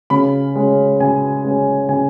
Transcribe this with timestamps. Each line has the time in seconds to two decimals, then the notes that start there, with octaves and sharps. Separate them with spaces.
0.10 C#3 B5
0.56 G#3 C#4
1.00 C#3 G#5
1.45 G#3 C#4
1.89 C#3 G#5